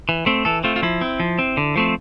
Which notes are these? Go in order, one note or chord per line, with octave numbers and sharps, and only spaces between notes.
E3
A3 C4
E3 A4
A3 C4 F4
F4
F3 E4
C4
F3
C4
D3
F3 A3 C4